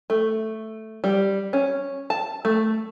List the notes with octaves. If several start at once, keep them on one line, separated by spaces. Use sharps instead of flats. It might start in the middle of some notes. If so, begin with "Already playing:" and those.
A3
G3
C#4
A5
A3